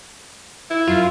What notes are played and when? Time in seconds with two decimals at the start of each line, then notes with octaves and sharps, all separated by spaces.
0.70 E4
0.88 F#2 F4